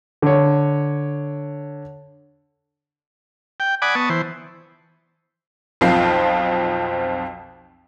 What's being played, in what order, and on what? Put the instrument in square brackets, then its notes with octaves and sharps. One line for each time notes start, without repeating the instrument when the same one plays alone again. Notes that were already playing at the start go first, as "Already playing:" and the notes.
[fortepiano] D3 C#5
[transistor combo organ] G5
D5 F#5 G#5 B5 D6 D#6
B3 A5 C#6 D#6
E3 C5
[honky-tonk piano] B1 F2 F3 C4 F4 C7